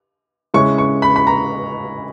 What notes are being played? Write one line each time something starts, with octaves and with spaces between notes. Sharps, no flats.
C#3 G#3 C#4 E4 C#6
C#6
B5
B5
A#5